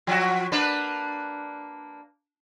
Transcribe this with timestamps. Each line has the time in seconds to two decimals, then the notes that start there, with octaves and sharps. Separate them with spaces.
0.07 F3 F#4
0.52 A#3 D4 B4